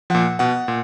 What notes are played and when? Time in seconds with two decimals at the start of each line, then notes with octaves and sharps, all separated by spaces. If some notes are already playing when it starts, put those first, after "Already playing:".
0.10 A#2 F3 F#5
0.39 B2 F#5
0.68 A#2